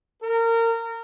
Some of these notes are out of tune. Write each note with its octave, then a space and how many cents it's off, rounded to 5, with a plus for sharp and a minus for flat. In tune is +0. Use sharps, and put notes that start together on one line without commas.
A#4 -25